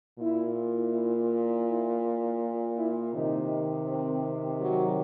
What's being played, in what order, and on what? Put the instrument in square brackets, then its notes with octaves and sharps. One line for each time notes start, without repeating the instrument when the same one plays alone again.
[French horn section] A#2 E4
E4
E4
F4
E4
C3 D#3 D#4
C4
F#3